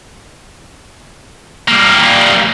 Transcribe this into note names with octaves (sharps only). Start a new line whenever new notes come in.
G3 A#3